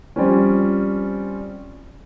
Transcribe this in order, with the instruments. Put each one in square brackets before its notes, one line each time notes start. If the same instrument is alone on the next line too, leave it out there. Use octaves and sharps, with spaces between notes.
[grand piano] F3 G3 C4 C#4